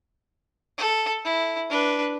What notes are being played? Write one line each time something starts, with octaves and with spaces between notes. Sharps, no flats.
A4
E4
D4 B4